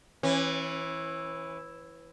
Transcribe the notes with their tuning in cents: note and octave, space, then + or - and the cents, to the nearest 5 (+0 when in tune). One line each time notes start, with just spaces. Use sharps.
E3 +0 C#4 -35